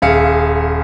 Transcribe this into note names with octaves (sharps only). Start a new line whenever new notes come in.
D#1 G#4 E5 F5 C#7